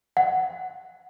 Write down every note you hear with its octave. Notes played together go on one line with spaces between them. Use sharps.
F#5